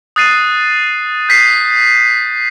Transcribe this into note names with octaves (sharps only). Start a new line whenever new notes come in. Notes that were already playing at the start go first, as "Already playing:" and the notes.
D#6 F#6 A6 C7 D#7
G6 B6 C7